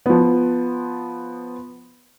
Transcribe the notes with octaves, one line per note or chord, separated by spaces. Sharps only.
F3 B3